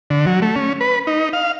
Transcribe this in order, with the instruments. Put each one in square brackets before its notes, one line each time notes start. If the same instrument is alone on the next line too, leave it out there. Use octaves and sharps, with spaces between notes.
[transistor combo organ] D3
F#3
A3
C#4
B4
D#4
F5